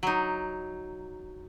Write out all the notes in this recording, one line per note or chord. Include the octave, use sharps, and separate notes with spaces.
F#3 D#4